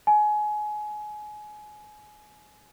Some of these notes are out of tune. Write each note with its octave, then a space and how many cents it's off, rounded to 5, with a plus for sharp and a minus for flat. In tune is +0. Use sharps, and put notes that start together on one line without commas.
G#5 +25